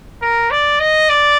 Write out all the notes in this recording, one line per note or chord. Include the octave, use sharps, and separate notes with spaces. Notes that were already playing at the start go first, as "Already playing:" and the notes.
A#4
D5
D#5
D5